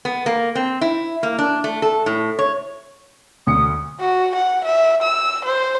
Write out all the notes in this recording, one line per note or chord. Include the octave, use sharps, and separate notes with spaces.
B3
A#3
C4
E4
A#3
D4
A3
A4
A2
C#5
D2 D3 D#6 C#7
F#4
F#5
E5
E6
C5